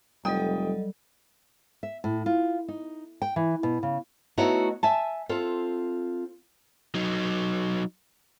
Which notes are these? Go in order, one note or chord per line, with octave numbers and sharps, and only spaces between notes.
F1 F#3 G3 A4 D#5 G5 D#6
E5
A2
F4
D#4
G5
E3
B2
C#3
A3 B3 D#4 E4 F#4 C#5
E5 G#5 A5
C4 F4 A4
F#3 D#4